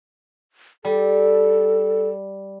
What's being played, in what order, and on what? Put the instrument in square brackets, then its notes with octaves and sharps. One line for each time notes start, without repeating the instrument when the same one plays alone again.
[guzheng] G3 [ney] A4